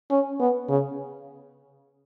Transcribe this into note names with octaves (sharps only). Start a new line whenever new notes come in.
C#4
B3
C#3